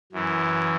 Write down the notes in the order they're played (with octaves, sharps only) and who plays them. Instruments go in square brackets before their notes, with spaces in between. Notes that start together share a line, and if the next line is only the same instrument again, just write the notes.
[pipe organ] F#2 E3